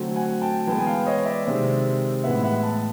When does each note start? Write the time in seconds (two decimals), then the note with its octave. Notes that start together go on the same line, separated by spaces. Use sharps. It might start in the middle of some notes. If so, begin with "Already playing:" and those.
Already playing: D3 F#3 A3 C4
0.15 F#5 G#5
0.42 G5 A5
0.67 E3 G#3 B3 G5 A5
0.79 G#5
0.87 F5 G5
1.06 C#5 D#5
1.26 D5 E5
1.46 C3 D#3 G#3 C4
2.24 A2 E3 G#3 B3 E5 F#5
2.44 E5 F#5
2.63 A5 B5